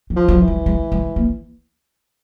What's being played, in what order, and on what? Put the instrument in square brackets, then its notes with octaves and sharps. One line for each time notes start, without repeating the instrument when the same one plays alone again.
[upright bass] E3
[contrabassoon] F3
[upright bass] F#3
[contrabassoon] E3
[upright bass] G3
G#3
G#3
A#3